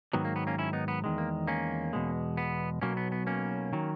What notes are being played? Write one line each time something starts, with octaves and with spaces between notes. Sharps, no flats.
G#2 D#3 F#3 B3
A#3
B3
A#3 C#4
C#4 E4
B3 D#4
B3
E2 D#3 G#3
A#3
A#3 C#4
E2 B2 G#3
B3
B1 B2 F#3 A#3 C#4
B3
B3
A#3 C#4
D#3 F#3